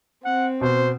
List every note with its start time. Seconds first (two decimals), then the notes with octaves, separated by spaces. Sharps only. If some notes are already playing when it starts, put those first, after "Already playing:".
0.25 C4 F#5
0.61 B2 C5